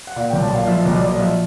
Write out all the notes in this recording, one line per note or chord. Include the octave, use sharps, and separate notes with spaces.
F#5
A#2 F5
B1 G5
A5
A#2 F5
F3 E5
B1 D#5
D5
A#2 D#5
F3 E5